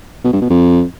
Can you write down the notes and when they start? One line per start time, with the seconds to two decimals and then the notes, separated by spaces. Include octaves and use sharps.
0.25 B2
0.33 G2
0.41 B2
0.50 F2